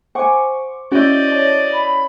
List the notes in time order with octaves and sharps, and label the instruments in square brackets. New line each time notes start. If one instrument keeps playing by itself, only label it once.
[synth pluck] C5 C#6 D6 [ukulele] F#5 G#5
[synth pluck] C#4 G6 [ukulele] E4 F#4 [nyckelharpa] D5 D#5
[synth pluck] C#5 A5
[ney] B5